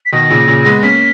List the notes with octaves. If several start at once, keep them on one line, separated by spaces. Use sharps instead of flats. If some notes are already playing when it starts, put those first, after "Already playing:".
B6
B2 D#3 A#6
A#2 C#3
A#2 C#3
G#3 B3
A#3 C#4 B6